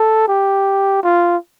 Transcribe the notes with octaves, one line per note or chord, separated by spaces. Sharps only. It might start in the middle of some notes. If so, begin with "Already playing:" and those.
Already playing: A4
G4
F4